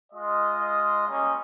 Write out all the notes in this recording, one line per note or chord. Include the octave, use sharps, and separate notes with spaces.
G#3 F4 D#5
G3 A#3 C#4 D#5